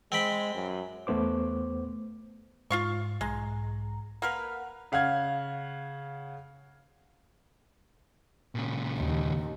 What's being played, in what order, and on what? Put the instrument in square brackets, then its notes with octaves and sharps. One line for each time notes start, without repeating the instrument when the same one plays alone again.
[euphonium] G#3 [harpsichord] C4 G5 B5
[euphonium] F#2
[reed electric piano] E2 A3 B3 C5 D6
[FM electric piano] G#2 [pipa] F4 F5 C#6
[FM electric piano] B1 G#2 A#5 [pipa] G#3
[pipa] A#3 A#4 B4 [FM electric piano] F#5 F6
[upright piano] C#3 F5 F#5 F6 G#6
[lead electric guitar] A#2 C#3
[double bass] D#2